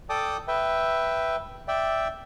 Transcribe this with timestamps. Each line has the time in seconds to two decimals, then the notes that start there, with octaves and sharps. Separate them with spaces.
0.10 A4 D5 G5 A5 D6 D#6
0.48 B4 E5 G5
1.68 D5 E5 G5